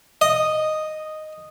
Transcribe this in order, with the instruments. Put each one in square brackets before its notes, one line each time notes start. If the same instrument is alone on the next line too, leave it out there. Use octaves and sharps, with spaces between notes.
[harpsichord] D#5